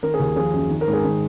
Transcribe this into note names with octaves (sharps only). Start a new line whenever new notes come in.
D#3 A#4
G#4
D#2
F3 G#4
F#2
D#3
A#4
G#2
G#4
D#3